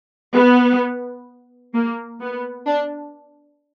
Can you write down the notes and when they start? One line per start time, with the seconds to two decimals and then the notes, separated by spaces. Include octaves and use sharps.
0.34 B3
1.74 A#3
2.20 B3
2.66 D4